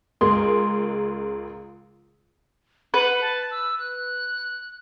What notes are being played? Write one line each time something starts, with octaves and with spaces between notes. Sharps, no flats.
C#2 C#3 G#3 G#4 A#4 C6
B4 F#5
A5
E6
F#6